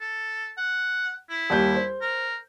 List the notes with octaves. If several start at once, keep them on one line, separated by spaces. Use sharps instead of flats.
A4
F#5
E4
D#2 G3 G6
C5
A#4